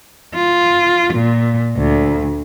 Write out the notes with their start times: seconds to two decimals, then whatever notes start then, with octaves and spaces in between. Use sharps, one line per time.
0.35 F4
1.14 A#2
1.77 D2